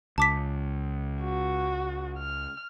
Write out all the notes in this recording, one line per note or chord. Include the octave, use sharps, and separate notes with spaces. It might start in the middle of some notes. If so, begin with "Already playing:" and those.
C#2 A5 D6 B6
F#4
F6